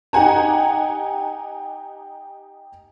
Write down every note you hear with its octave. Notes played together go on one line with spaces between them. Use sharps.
D#4 G4 F#5 G#5 A#5